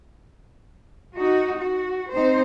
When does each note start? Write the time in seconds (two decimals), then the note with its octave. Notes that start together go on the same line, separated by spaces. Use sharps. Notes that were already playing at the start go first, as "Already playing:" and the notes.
1.15 D#4 F#4
1.58 F#4
2.12 C4 D#4 C5